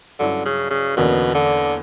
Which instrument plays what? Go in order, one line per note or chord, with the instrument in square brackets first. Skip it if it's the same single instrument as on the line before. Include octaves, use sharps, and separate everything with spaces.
[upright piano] G2 F#3 C#4 E4 [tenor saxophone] D3
[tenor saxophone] C#3
C#3
[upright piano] E2 D3 A#3 C#4 [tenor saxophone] B2
[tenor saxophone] D3